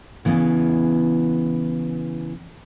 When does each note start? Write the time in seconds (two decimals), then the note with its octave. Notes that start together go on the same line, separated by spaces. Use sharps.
0.25 C#3 E3 B3